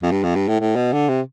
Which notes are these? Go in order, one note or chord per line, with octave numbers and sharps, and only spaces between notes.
F2
G2
F2
G2
A2
A2
B2
D3
C3